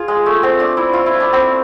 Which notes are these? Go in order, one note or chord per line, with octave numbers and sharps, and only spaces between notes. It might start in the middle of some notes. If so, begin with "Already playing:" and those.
Already playing: F4 G#4
G#3
A3
C4
D4
E4
F4
E4
D4
C4